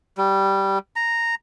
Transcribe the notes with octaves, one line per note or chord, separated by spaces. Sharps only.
G3
A#5